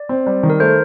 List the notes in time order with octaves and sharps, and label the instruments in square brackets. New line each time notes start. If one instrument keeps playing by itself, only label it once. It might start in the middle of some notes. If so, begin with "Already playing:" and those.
Already playing: [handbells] D5
[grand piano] C4
G3
D#3
[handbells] A#4
[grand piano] A3 [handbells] C5